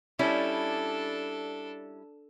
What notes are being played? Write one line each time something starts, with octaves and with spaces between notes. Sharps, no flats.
G3 C#4 D4 E4 A4